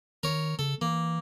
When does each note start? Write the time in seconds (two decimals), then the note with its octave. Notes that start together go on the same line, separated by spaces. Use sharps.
0.23 D#3 A#4 C#5
0.59 C#3 A4
0.82 E3 A#3